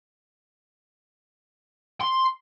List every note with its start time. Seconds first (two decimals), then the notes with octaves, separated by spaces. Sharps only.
2.01 C6